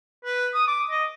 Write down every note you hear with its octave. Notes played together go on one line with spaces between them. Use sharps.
B4
D#6
D6
D#5